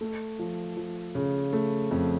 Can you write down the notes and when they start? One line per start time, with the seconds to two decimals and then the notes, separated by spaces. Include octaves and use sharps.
0.01 A3
0.39 F3
0.77 F3
1.15 C#3
1.53 A3
1.91 F2